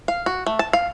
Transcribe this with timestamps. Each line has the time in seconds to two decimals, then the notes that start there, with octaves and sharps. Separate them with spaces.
0.08 F5
0.26 F#4
0.46 A3
0.59 A5
0.73 F5